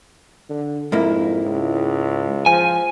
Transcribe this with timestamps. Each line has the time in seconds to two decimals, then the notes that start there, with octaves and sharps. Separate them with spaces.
0.50 D3
0.92 F2 G#2 A#3 E4
1.45 C#2
2.46 F3 G#5